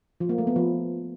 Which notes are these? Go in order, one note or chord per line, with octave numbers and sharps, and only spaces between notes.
F3
A#3
A3
B3
F3